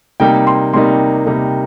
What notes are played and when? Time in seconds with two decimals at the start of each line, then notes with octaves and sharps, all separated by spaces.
0.20 C3 G3 A#3 D#4 G5
0.47 C6
0.73 C3 G3 A#3 D#4 C6
1.26 C3 G3 A#3 D#4